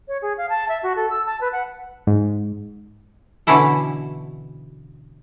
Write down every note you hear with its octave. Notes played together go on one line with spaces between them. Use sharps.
C#5
G#4
F5
A5
E5
F#4
A4
E6
A5
B4
F#5
G#2
B2 D3 E3 C#4 E4 A4